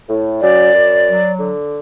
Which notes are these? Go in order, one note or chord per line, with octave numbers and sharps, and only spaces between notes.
A2
F#2 D5
F#2
F#3
D3